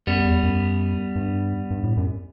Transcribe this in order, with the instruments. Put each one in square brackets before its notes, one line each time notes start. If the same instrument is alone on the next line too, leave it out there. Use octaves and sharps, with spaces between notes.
[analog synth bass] F#2 [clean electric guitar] G3 B3
[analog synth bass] E2
F#2
G2
G2
A2
F#2